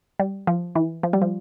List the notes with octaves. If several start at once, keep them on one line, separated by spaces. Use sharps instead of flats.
G3
F3
E3
F3
G3
F3